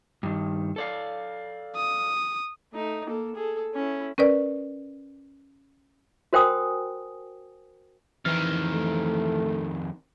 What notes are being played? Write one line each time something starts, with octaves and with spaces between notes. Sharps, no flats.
G2 D#3
A4 D5 F5
D#6
A3 D#4
A#3 A4
G#4 A4
C#4 E4
C#4 A#4 B4 D5
F#4 A#4 C5 G5 G#5 D#6
F2 D#3 E3 E4 F6
A3